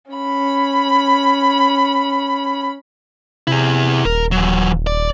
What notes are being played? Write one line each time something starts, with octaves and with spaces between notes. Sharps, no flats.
C#4 B5
C3 E4 G#4
D#1 A#4
E3 F#3
D5